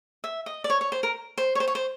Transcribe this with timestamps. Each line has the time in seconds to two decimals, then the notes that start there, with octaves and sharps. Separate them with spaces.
0.24 E5
0.46 D#5
0.64 D5
0.70 C#5
0.81 C#5
0.92 C5
1.03 A#4
1.38 C5
1.55 C#5
1.60 C5
1.68 C#5
1.75 C5